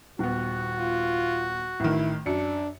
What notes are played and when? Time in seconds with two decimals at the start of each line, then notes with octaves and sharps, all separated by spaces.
0.19 D#1 B3 F#4
0.79 F4
1.80 A1 D#3 E4
2.26 F#2 D4 C#7